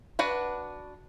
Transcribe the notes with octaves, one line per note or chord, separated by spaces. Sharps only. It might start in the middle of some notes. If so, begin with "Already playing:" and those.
D4 F#4 B4 F#5